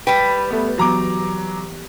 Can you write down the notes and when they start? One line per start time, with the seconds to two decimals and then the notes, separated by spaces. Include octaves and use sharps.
0.07 G3 B4 G5
0.51 A3 B3
0.78 E3 F#3 B3 A#5 D6